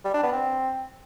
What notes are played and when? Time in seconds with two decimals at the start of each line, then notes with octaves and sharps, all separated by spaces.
0.05 G3
0.14 D4
0.23 B3
0.32 C4